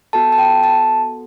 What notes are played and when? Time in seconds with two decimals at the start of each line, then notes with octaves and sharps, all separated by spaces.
0.13 B3 F#4 A4 A5
0.32 A5
0.38 G5
0.63 A5